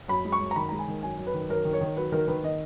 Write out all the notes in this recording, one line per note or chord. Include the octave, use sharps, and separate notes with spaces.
F#2 B5
G#3
C#6
F#2
A#5
D#3 B5
G#3 A#5
G#5
D#3
F#2 G#5
F#2
B4
D#3
F#2 A#4
D#3
C#5
D#3
F#3 B4
D#3 A#4
D#3 B4
D#3 D#5